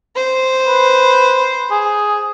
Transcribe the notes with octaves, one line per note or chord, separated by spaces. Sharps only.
C5
B4
G#4